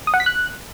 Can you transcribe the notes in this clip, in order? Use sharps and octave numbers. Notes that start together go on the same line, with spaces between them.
D#6
F#5
B6
F#6